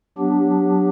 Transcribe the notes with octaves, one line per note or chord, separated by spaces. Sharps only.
F#3 B3 D4 G4